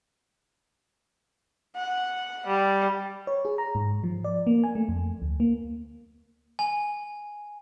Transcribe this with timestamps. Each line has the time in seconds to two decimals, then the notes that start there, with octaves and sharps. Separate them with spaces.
1.76 F#5
2.47 G3
3.27 C#5
3.45 G#4
3.58 A#5
3.75 G#2
4.04 F3
4.24 D5
4.47 A#3
4.64 G#5
4.75 A3
4.89 F2
5.22 D2
5.40 A#3
6.59 G#5